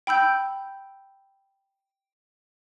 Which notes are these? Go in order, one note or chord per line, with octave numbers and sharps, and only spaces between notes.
G5 B5 E6 G6